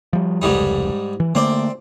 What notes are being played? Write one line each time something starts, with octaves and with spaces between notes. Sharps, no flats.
F3 G3
F1 C#2 G#2 G3 D#4
E3
D3 A3 A#3 C4 D5